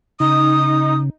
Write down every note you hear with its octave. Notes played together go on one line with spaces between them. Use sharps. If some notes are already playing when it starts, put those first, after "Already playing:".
C#3 D#4 D#6